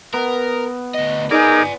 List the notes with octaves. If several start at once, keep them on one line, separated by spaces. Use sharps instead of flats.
B3 A#4
D2 D#5
D#4 G#4 A#4 D5 G#5 D6